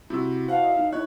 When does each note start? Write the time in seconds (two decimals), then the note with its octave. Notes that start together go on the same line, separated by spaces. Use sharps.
0.10 C3 E4 F#4 E6
0.48 C5 F5 F#5 A5
0.62 D#5 E5
0.76 D#4
0.92 E4 C#5 F#6